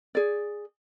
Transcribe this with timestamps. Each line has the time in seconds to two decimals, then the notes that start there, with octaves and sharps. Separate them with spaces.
0.15 G#4 D5